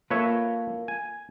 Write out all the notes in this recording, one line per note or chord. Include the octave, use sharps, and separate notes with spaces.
A#3 F4 A4 B4 C#5 E5
G#5